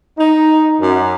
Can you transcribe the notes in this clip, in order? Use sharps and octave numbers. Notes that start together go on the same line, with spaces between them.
D#4
F#2